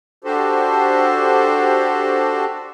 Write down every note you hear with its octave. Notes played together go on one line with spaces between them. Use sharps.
D4 F#4 G4 A4 C5